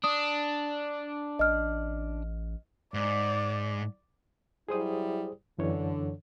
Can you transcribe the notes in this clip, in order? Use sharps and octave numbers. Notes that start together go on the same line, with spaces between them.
D4 D#6
A1 D#5 F6
G#2 D5
F#3 G3 E4 G#4 C5 D#6
F#2 D3 E3 C#5